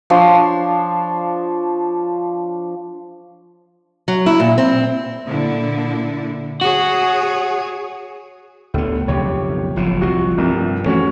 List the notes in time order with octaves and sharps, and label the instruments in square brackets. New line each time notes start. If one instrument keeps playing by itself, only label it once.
[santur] F3 D4 C#5 C6
[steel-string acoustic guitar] F#3
E4
A#2
C4
[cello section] A#2 D3 E4
[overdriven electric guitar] F#4 [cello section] G#4 C#5
[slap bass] D2 B3 [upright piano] A2 D3
[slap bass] B1 F2 C#3 [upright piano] G4 C#5
[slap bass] F#1 A2 C3 [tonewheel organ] F3
[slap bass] C2 C3 [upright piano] F#4
[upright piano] C2 C3 [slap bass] G2
[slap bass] E3 F3 [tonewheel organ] A3 [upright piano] C#4 F#4